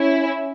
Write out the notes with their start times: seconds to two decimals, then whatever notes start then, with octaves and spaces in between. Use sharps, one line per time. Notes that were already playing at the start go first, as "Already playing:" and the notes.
Already playing: C#4 E4